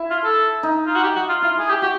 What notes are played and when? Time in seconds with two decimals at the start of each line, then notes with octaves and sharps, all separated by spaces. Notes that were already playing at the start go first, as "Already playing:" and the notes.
Already playing: E4
0.10 F4
0.24 A4
0.63 D#4
0.87 F4
0.95 F#4
1.03 G4
1.15 F#4
1.29 F4
1.42 E4 F4
1.59 G#4
1.69 G4
1.82 F#4 G4